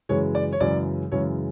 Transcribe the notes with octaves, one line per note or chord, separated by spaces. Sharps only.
F#2 C#3 E3 G#3 C#5
D5
C#5
F#2 C#3 E3 G#3 D5
F#2 C#3 E3 G#3 C#5